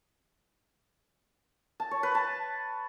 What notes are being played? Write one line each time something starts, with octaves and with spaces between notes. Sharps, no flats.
A5
C#5
B4
A5